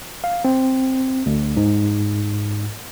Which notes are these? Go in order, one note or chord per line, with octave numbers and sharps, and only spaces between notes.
F5
C4
D2
G#2